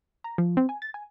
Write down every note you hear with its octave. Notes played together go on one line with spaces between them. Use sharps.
A#5
F3
C4
G#5
A6
G#5